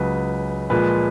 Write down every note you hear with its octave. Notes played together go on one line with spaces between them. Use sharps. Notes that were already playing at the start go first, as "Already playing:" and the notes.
Already playing: C#2 C#3 F#3 B4
A#2 F3 G#3 B4